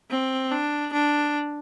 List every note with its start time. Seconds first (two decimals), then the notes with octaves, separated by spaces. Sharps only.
0.11 C4
0.52 D4
0.93 D4